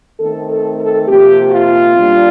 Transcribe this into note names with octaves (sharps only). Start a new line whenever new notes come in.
D#3 A3 C4 A4
A4
A4
C3 F3 A#3 G4
F4
A#2 G3 D4